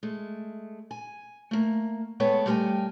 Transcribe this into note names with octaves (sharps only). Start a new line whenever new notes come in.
G#3 A3
G#5
A3 A#3
G#3 A3 B3 C#5 G5 A5
G3 A3 A#4 C5 G5 G#5